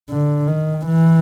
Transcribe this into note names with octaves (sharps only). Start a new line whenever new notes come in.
D3
D#3
E3